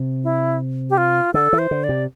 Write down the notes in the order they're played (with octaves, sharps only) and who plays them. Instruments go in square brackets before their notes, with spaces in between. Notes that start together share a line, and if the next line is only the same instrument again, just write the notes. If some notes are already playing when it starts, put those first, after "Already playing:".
Already playing: [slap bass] C3
[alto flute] E4
G4
F4
[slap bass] D3 [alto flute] A4
[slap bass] E3
[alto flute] C5
[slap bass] D3
[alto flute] D5
[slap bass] C3